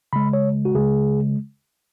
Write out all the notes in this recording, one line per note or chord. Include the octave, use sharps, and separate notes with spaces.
C#3 G#3 B5
C#5
F#4
C#3 G#3 G#4